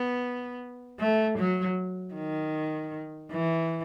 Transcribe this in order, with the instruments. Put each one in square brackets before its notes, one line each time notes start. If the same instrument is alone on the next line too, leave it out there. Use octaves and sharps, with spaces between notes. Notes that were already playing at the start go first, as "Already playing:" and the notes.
Already playing: [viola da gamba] B3
A3
F#3
D#3
E3